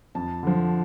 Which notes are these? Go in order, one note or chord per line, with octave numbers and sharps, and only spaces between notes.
F2 A5
D3 F3